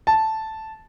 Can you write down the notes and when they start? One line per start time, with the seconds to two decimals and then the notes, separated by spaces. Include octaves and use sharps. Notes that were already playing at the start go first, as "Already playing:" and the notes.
0.07 A5